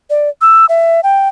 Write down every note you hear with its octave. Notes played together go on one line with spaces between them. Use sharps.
D5
E6
E5
G5